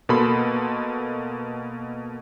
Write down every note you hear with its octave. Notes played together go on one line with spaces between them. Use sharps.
B2 A#3 A4 B5 C6